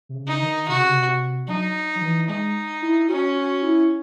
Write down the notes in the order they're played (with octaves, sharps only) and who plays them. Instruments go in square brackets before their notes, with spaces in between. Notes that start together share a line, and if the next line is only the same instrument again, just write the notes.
[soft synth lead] C3
C#3
[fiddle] D#4
[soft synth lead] D#3
[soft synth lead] C3 [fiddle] F#4
[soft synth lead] C#3
C3
C3
[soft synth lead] F#3 [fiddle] D#4
[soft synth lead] F#3
E3
[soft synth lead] G#3 [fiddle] D#4
[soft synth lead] E4
[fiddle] C#4 [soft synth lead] F#4
[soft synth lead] F#4
E4